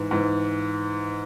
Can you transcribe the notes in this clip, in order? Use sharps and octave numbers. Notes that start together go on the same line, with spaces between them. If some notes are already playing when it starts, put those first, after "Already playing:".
Already playing: G#2 E3
G#2 E3